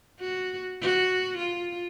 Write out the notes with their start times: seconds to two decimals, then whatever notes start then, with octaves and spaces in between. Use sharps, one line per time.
0.20 F#4
0.82 F#4
1.38 F4